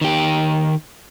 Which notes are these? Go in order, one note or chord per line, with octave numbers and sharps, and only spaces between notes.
D#3 G4